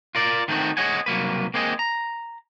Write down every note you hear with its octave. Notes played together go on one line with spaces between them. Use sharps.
F4 A#4 D5
D#3 A3 C4 D#4 F#4
G#4 C#5 D#5 F#5 G#5
C2 F#3 A#3 B4
A#3 C4 G#4 D#5
A#5